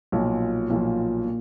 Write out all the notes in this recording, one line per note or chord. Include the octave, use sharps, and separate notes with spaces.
B1 A#2 F3
B1 A#2 F3
A#2